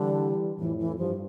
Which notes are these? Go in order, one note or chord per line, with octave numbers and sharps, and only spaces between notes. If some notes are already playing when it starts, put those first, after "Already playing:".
Already playing: D3 E3 G3
F2 A2 E3
E3
G2 F3